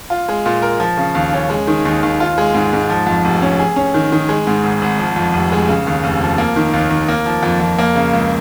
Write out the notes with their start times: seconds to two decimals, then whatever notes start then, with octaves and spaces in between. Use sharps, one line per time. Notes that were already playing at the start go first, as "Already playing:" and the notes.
0.10 F4
0.29 G#3
0.46 A#2
0.62 A#4
0.80 F3
0.97 C#3
1.15 D#2
1.33 C#4
1.50 G#3
1.67 D#3
1.85 D#2
2.03 D#2
2.20 F4
2.38 G#3
2.55 G#2
2.73 G#2
2.90 F3
3.07 F2
3.25 F1
3.42 C#4
3.59 G#4
3.76 C#4
3.94 D#3
4.12 D#3
4.29 G#3
4.47 G#2
4.64 G#1
4.82 G#1
4.99 F3
5.16 F2
5.34 F1
5.52 G#3
5.69 C#3
5.87 D#2
6.04 F1
6.21 F3
6.38 A#3
6.56 D#3
6.73 D#2
6.90 D#2
7.09 A#3
7.26 F3
7.43 F2
7.60 F2
7.79 A#3
7.95 C#3
8.13 C#2